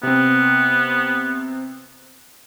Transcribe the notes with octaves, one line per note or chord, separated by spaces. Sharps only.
C3 B3 C4